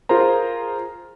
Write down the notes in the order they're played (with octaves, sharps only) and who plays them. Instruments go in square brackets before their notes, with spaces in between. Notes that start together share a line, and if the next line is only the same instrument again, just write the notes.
[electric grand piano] F4 G#4 A#4 C5 A#5